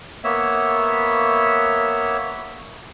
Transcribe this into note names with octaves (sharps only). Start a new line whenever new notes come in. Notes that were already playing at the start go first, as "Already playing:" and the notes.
A#3 B3 C#5 E5